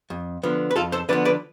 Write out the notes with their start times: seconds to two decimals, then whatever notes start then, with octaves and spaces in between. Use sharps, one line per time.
0.10 F2
0.43 D3 F3 B3
0.71 B4
0.76 F2 F4 A4
0.92 A4 C5
1.09 D3 F3 B3 B4 D5
1.25 B4 D5